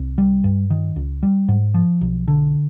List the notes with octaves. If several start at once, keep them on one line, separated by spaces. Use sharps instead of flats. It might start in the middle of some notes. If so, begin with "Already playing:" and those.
Already playing: C2
G3
G2
D#3
C#2
G3
G#2
F3
B1
D3